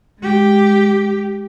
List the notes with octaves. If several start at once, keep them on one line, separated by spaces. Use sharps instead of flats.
G#3 G4